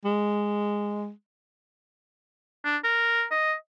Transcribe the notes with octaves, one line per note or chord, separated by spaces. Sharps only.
G#3
D4
A#4
D#5